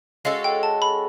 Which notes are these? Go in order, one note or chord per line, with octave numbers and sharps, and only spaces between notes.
G#3 C#4 F#4 A4 F5
G5
A5
B5